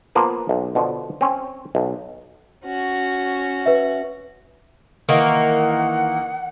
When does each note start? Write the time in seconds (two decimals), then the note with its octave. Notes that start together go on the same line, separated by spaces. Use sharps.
0.15 F3 A#3 B3 F4
0.49 B1
0.75 B2 D3 F3
1.21 C4 C#4
1.75 B1
2.65 C#4 F#4
3.66 B4 E5
5.09 D#3 E3 A#3 F#5